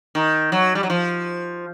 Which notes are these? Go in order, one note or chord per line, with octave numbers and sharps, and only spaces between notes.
D#3
F#3
G3
F#3
F3